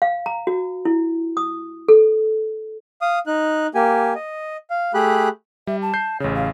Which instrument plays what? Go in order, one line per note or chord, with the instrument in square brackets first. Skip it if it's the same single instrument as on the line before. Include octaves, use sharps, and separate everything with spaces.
[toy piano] F5
A#5
F#4
E4
D#6
A4
[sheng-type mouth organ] F5 D#6
D#4 F#6
A#3 G4 G#5
D#5
F5
A3 G4 G#4 B5 F#6
[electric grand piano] G3 [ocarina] E5
[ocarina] A5
[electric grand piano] G6 C7
[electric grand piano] A1 C#3 [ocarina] C#5
[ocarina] F5